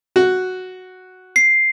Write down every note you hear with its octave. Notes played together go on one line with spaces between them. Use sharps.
F#4
C7